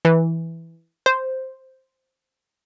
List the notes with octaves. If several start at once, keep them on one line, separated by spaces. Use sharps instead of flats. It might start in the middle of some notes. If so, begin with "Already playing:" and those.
E3
C5